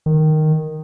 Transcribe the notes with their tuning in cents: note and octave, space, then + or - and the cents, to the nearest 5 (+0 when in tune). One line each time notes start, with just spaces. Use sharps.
D#3 -5